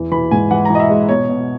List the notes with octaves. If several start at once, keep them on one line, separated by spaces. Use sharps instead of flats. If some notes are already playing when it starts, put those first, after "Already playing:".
Already playing: E2 E3
E3 B5
G#2 G#5
E3 F#5
A#5
E3 D#5
E5
G#3
B2 C#5
B2